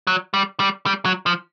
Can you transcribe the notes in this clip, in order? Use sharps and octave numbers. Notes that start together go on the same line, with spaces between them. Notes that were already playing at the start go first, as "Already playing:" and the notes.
F#3
G3
G3
G3
F#3
F3